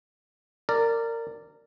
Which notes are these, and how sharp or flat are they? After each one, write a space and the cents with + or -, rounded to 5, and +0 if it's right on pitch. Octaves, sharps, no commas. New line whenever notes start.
A#4 -20 D5 +0